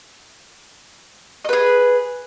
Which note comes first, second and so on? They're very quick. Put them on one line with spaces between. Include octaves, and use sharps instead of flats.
D#5 B4 G#4